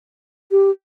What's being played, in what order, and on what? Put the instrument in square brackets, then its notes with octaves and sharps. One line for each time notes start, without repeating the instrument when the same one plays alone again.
[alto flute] G4